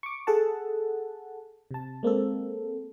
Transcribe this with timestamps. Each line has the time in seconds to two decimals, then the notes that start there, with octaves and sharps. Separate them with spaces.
0.03 C#6 D6
0.27 G#4 A4 F#5 A5
1.71 C3 A5
2.03 G#3 A#3 C4 A4